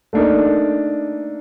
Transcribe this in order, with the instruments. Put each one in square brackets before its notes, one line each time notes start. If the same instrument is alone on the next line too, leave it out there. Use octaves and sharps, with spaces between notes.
[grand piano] A3 A#3 D4 D#4 A#4